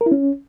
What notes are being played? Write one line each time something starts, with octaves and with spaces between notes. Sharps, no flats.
A#4
E4
C#4